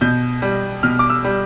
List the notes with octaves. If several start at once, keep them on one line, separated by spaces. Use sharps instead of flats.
B2 G6
G3
B2 F6
D6
E6
G3